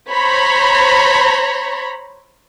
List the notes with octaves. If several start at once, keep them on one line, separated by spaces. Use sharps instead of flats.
C5 C#5 A#5 B5